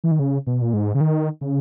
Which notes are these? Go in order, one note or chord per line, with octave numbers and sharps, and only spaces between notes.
E3
D#3
C#3
B2
A#2
G#2
C#3
D#3
C#3